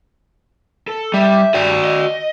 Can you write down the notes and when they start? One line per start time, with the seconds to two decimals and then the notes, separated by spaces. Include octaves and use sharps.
0.88 A4
1.14 G3 E5
1.54 G2 F#4 D5
1.84 D#5